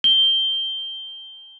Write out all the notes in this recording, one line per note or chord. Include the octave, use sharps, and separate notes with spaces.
G7